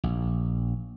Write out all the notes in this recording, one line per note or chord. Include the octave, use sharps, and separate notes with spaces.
A#1